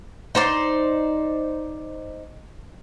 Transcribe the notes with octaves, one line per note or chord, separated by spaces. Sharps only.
D#4 C5 D5